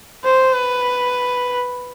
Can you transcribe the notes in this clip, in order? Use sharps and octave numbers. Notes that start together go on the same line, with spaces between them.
C5
B4